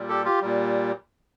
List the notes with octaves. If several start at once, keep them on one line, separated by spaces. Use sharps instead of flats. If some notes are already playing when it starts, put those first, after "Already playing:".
Already playing: A#2 G3
G4 A4
F4 G4
A#2 G3